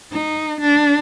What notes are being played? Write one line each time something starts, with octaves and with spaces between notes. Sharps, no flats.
D#4
D4